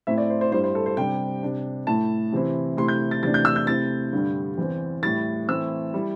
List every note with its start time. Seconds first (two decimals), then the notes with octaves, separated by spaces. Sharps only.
0.07 A2 A3 C4 E4 E5
0.18 D5
0.30 C5
0.41 C5
0.52 G2 G3 E4 C5
0.64 C5
0.75 A4
0.86 C5
0.97 C3 G3 D4 G5
1.43 C3 G3 D4
1.87 A2 A3 E4 A5
2.32 C3 E3 C4 E4
2.77 C3 A3 E4 C6
2.88 G6
3.11 A6
3.23 E2 C3 A3 D4 A6
3.34 G6
3.45 E6
3.56 G6
3.67 C3 A3 C4 E4 A6
4.13 G2 D3 G3
4.58 E2 E3 C4
5.03 A2 G3 E4 A6
5.48 A2 E3 A3 C4 E4 E6
5.94 G3 E4